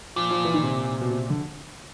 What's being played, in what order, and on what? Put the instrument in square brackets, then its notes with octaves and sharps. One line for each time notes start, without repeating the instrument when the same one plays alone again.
[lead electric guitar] A#2 [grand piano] F3
[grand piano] F3
E3
D#3
C3
B2
C3
D3